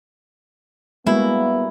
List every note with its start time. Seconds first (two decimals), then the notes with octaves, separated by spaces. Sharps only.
1.07 G3 G#3 A#3 B3 E4 F#4